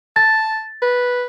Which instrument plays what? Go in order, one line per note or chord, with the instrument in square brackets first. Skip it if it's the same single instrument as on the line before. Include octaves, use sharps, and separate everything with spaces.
[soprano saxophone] A5 [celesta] A6
[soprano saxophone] B4